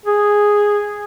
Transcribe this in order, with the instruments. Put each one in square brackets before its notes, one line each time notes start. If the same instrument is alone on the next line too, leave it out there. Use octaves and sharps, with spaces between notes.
[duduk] G#4